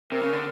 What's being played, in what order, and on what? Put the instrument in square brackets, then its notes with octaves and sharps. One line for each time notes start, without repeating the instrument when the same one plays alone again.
[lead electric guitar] C3 [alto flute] A#4
[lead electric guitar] C#3
D3